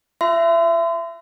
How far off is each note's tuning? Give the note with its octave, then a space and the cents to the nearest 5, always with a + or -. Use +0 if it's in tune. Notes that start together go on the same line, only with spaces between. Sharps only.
F4 -15 E5 +25 C6 -35